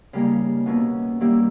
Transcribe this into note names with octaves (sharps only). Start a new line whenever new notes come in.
C#3 G3 A#3 D#4
B2 A#3 C#4 E4
D#3 G3 A#3 E4 G4